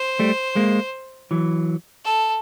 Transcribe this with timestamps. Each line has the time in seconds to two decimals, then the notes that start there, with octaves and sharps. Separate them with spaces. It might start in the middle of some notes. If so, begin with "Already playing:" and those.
Already playing: C5
0.19 G3 A3
0.56 G#3 A#3
1.31 E3 F#3
2.05 A4